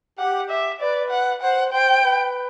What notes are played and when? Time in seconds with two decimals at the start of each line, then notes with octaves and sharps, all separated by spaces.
0.19 G4 F#5
0.50 E5
0.80 B4 D5
1.11 F#5
1.42 C5 F#5
1.72 C5 G5
2.03 B4